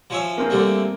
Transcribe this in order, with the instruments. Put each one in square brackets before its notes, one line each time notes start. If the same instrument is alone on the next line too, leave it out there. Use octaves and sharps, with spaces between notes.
[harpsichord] F3 C#4 E5
[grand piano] A#3 C4 G#4
[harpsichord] D3 G3 A3